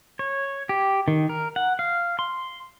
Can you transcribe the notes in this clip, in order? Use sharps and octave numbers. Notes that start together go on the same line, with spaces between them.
C#5
G4
D#3
A#4
F#5
F5
C6